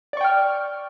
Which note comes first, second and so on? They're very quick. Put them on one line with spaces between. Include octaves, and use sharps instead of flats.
D5 C#6 G5 F6